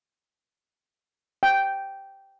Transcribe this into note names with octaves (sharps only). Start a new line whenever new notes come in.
G5